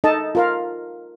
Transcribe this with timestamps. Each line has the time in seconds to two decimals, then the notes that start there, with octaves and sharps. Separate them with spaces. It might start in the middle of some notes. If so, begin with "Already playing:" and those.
0.04 D#4 A4 D#5 A5
0.35 F4 A#4 F5